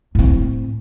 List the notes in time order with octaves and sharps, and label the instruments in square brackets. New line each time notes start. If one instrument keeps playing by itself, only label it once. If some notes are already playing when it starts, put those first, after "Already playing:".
[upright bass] A2 C4